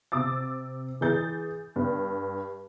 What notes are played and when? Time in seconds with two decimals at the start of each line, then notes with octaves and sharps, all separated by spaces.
0.12 C3 D6 E6 A6
1.01 E3 G#4 G6 A6
1.76 G2